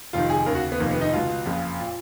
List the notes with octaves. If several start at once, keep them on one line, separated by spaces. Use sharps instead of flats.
F1 F2 D#3 F4
G#4
D#2 C#3 A#4
F#4
B3
F1 F2 D#3 A#3
B3
D#4
C#2 B2 F4
F#1 F2 C#3
A#2